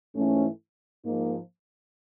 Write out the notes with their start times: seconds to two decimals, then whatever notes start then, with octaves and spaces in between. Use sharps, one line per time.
0.14 G#2 E3 A3 C#4
1.04 G#2 F3 A#3 D#4